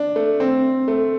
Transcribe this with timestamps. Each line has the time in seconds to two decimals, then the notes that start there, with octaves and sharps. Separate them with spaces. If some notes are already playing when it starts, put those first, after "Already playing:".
Already playing: D4
0.16 A3
0.40 C4
0.88 A3